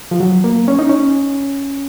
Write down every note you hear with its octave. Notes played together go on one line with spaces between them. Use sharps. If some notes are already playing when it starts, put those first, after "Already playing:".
F3
F#3
A#3
C#4
D#4
C#4